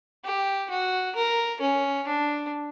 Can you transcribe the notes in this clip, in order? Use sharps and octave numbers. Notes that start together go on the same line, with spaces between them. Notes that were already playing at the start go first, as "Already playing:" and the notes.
G4
F#4
A#4
C#4
D4